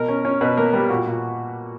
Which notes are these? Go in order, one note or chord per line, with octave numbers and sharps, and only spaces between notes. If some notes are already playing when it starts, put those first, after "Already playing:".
Already playing: B2 A#4
C#4
C#4
B2 B4
A#3 A#4
G3 B4
A#2 F#4
A#2